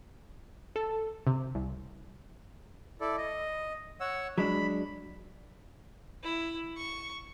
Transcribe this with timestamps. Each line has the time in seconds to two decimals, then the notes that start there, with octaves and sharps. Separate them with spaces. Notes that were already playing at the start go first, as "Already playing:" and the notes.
0.76 A4
1.27 C3
1.55 C2
3.01 E4 A4 D5
3.18 D#5
4.01 C#5 F#5 E6
4.38 F#3 G#3 D4 B5
6.23 E4
6.77 C#6